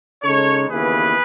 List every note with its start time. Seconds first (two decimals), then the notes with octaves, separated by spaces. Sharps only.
0.23 C#3 G#3 D#4 A4 C#5
0.69 D#2 C#3 E3 B3 G#4 B4